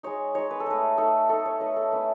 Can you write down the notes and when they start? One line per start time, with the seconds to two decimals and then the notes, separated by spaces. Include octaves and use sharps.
0.03 G#3 D#4 C#5
0.35 G#3 D#4 C#5
0.51 B4
0.60 A4
0.66 A3 D#4 B4
0.98 A3 D#4 A4
1.29 A3 D#4 A4
1.46 C#5
1.60 A3 D#4 B4
1.76 A4
1.92 A3 C#4 E4 B4